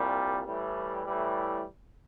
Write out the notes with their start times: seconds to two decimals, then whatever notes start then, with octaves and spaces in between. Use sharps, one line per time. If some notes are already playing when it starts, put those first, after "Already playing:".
Already playing: C2 A#2 G3
0.44 A2 E3 G3
1.05 A2 E3 G3